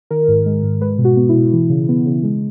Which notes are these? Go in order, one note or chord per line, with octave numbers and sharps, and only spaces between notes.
D#3 A#4
G#2
G#3
G#2
G#3 B4
B2
F#4
B3
E4
B2
E3
C#3
B3
C#3
G#3